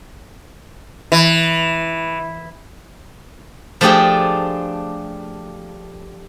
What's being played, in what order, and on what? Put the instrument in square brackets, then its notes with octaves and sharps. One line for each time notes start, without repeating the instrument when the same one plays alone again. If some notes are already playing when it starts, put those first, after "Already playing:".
[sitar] E3
[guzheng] F3 A3 D4 F4 G4 G#4